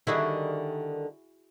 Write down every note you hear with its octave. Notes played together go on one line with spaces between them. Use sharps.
D3 D#3 G3 E4 F#4 G#4